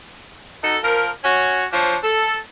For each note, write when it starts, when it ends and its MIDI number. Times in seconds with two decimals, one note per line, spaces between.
0.64 0.78 63
0.64 0.78 66
0.64 0.78 69
0.83 1.09 53
0.83 1.09 70
1.24 1.66 61
1.24 1.66 66
1.24 1.66 73
1.72 1.97 53
1.72 1.97 62
1.72 1.97 72
1.72 1.97 73
2.03 2.38 69